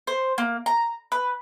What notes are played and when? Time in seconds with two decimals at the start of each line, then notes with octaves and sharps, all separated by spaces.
0.07 C5
0.38 A#3
0.66 A#5
1.12 B4